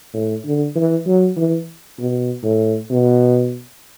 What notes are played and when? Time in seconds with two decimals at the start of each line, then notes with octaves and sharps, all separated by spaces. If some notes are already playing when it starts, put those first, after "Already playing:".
0.14 A2
0.45 D3
0.75 E3
1.06 F#3
1.37 E3
1.99 B2
2.44 A2
2.90 B2